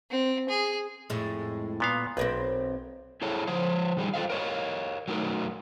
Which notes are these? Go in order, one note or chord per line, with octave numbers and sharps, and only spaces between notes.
C4
G#4
F2 A2 G#3
A#2 B3 F5
B1 C4 A#4 B4
E4 G#4 A4 C#5
F3 C5 C#5
D#3 G3 G#4
F4 A4 C5 D#5 F5
A#4 C#5 D#5
F#3 A3 D#4 A#4